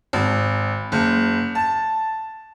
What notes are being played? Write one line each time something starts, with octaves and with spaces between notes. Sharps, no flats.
G#1
F#1
A5